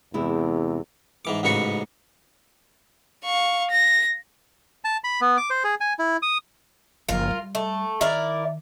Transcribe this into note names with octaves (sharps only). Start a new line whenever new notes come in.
E2 C3 G#3 E4
G#2 E3 D6
A1 G#2 C#3 F#4 B4 C#6
F5 C#6
A#6
A5
B5
B3
D6
C5
G#4
G#5
E4
D#6
F#1 F3 F4 A#4
G3
A3
D#3 E4 A#4 D5